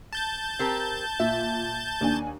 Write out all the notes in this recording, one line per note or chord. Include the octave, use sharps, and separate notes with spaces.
A5 G6 A6
C4 G4 A#4
A#2 E5
D#2 D4 G#5